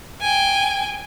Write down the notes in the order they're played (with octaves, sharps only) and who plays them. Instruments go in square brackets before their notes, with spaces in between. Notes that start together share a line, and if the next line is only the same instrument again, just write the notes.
[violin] G5 G#5